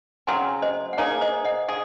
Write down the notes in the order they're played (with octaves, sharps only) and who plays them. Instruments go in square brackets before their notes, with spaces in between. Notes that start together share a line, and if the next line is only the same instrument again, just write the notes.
[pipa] C#3 F#3 C4 [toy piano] G#5 C6
[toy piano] C5 D#5
F#5
[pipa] A#3 D#4 G#4 [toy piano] C#5 F5
[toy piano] C5 D#5
D#5 F#5
[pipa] G#4 [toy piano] F5 G#5